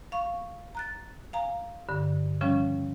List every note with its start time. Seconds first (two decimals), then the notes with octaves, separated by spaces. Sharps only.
0.12 F5 C#6
0.75 A#5 F#6 A6
1.33 F5 G#5 A#5
1.89 G2 D3
2.41 C#3 F3 G3 C#4